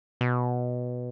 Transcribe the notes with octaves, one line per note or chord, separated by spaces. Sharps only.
B2